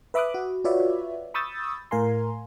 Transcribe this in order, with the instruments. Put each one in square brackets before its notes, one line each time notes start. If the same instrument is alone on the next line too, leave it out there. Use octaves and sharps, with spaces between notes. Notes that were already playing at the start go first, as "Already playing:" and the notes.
[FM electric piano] B4 E5 B5 D6 D#6 F#6
F#4
F4 F#4 B4 C#5 D5 E5
B5 C#6 D#6 E6 G6 A6
A2 A#4 F5 G#5 A#5 C6